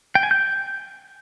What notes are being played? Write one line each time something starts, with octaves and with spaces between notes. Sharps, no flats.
G5
G#5
G6